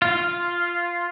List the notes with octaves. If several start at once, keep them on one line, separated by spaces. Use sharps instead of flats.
F4